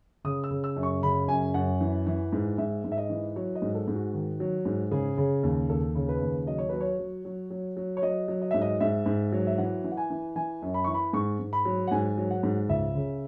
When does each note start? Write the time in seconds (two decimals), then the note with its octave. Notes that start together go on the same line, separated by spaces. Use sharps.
0.24 C#3 D#6
0.44 E6
0.50 C#3
0.64 E6
0.77 F#2
0.83 C#6
1.03 C#3 B5
1.28 F#2 G#5
1.54 F#2 F#5
1.81 E3
2.07 E3
2.33 G#2
2.58 G#2 E5
2.84 G#2
2.92 E5
2.97 D#5
3.10 E3
3.36 F#3 C#5
3.55 D#5
3.62 G#2
3.75 A4
3.88 G#2
3.94 F#4
4.14 D#3
4.40 F#3
4.65 G#2
4.91 C#3 G#4
5.17 C#3
5.43 D#2
5.69 D#2 A4
5.95 C#3
6.09 B4
6.21 D#2
6.47 F#3 D#5
6.58 C#5
6.69 F#3 B4
6.81 C#5
6.99 F#3
7.25 F#3
7.50 F#3
7.77 F#3
7.97 C#5
8.02 F#3 D#5
8.28 F#3
8.41 D#5
8.51 G#2 E5
8.62 D#5
8.81 G#2 E5
9.06 G#2
9.32 F#3
9.47 E5
9.58 E3 F#5
9.84 E3
9.92 F#5
9.97 G#5
10.10 E3
10.36 E3 G#5
10.62 F#2
10.74 B5
10.84 E3 C#6
10.94 B5
11.13 G#2 C#6
11.39 G#2
11.53 B5
11.65 F#3
11.87 F#5
11.91 G#2 G#5
12.18 F#3
12.31 F#5
12.43 G#2
12.69 C#2 E5
12.95 C#3